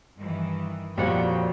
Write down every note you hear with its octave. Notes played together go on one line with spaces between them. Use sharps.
G2 D#3 E3
F2 A#2 G3 F#4 C#5 G5